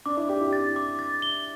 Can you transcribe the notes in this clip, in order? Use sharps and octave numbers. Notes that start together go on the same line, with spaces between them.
D4 D6
E4
G4 D6
E4
A6
D6
A6
G7